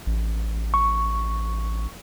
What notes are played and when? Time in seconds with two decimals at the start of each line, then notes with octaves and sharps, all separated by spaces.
0.07 A1
0.74 C#6